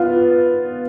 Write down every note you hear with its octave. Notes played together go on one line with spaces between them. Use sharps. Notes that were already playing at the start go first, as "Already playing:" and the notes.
Already playing: B3 F4